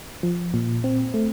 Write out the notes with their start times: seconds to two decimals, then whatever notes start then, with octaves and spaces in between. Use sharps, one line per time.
0.23 F3
0.54 A#2
0.84 C4
1.14 A3